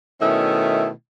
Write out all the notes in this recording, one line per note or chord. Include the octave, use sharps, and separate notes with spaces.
B2 D#3 A3 C#4 E4